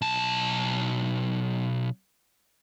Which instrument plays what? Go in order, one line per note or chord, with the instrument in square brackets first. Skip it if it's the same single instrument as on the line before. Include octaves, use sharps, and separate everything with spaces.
[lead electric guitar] B1 A5